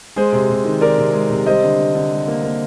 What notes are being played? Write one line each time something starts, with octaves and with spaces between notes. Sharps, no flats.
G#3 G#4 C5
C3
C3
D#3
D#3 A#4 D5
C3
G#3
C3
G3 C5 D#5
D3
D3
D3
G3
A#3
A#3